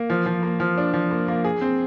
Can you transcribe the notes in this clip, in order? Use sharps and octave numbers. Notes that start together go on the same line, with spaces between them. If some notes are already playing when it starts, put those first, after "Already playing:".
Already playing: A#3
F3
F3
A#3
F3
D4
F3
A#3
A#3
G#4
C4